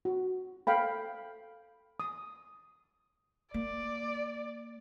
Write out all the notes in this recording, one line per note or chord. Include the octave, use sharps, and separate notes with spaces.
F#4
A4 F5 G5 B5
D#6
A#3 D5